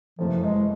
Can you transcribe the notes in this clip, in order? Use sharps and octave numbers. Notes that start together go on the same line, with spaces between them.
F#1 F2 C3 E3 F3 A3
G#3